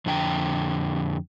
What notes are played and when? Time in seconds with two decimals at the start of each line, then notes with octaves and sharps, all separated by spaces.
0.06 F2 D3 G5 G#5 A#5